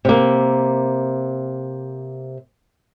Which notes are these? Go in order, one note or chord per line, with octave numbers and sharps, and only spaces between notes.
C3 A#3